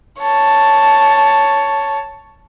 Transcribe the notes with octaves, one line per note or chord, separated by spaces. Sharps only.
C#5 A5